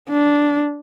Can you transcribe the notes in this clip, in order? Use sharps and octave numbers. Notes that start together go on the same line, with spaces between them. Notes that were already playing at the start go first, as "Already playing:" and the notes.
D4